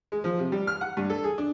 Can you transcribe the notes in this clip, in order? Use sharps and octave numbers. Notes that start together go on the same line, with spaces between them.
G#3
F3
C3
G3
F6
F#5
G2
A4
G#4
D4